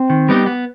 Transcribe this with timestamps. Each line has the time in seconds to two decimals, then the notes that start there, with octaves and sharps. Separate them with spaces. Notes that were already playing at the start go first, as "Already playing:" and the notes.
Already playing: C4
0.10 D#3
0.29 G3 B3 D#4 G4
0.46 B3